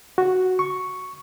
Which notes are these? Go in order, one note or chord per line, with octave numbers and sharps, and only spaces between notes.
F#4
C#6